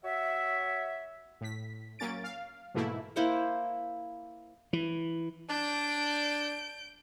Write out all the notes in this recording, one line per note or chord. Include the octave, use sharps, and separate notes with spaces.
F#4 C#5 E5
A2 B6
F#3 A#3 C#4 A6 D7
F5
G#2 B2 E3 A3 A#3 E4
A#3 E4 C5 F#5
E3
D4 G6 D7